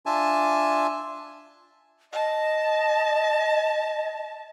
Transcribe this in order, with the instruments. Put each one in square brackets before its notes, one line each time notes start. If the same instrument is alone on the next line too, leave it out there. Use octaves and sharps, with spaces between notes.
[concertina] D4 F4 E5 G#5 A5
[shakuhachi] D#5 [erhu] A5